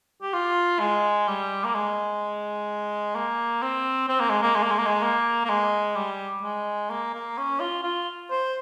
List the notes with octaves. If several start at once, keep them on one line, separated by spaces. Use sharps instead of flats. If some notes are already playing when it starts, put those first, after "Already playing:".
G4
F4
G#3
G3
A#3
G#3
A#3
C4
C4
A#3
G#3
A#3
G#3
A#3
G#3
A#3
G#3
A#3
A#3
G#3
G3
G#3
A#3
A#3
C#4
F4
F4
C5